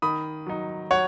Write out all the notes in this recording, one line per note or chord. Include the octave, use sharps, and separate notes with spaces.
D#3 B5 D#6
F#3 D#4
F#3 C#5 F#5